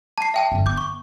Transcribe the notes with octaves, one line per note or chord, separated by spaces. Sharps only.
A5 C7
E5 G5 A5
G2 D3
B3 D6 G6
C#6